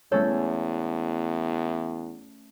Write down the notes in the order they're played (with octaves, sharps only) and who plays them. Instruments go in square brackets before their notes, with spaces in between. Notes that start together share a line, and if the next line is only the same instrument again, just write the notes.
[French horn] E2 [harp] A3 C#4 A4 [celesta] C#5